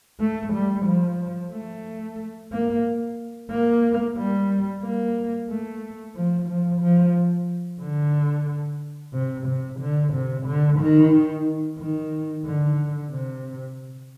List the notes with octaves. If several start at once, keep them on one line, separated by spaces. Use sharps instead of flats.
A3
G3
F3
A3
A#3
A#3
G3
A#3
A3
F3
F3
F3
D3
C3
C3
D3
C3
D3
D#3
D#3
D3
C3